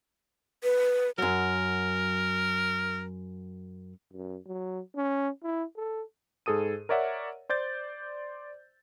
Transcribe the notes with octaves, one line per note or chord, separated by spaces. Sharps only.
B4
F#2 F#3 A#4
F#2
F#3
C#4
E4
A4
G#2 G#4 A4 D#6 D#7
A#4 C#5 D5 E5 F#5
C5 D5 G6 A6